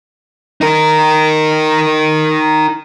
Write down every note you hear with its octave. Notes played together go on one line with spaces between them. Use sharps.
D#4 A#4